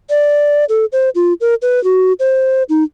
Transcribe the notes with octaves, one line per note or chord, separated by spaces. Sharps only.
D5
A4
C5
F4
A#4
B4
F#4
C5
D#4